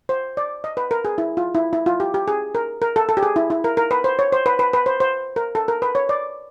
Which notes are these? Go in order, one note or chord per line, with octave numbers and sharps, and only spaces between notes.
C5
D5
D#5
B4
A#4
G#4
E4
F4
E4
E4
F4
G4
G4
G#4
A#4
A#4
A4
A4
G4
G#4
E4
E4
A#4
A#4
B4
C5
C#5
C5
B4
B4
B4
C5
C5
A#4
A4
A#4
B4
C#5
D5